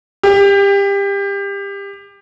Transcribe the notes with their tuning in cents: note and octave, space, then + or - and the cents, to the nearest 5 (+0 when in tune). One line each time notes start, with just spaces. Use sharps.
G4 +25